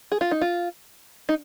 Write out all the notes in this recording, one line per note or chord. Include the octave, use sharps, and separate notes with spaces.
G#4
F4
D#4
F4
D#4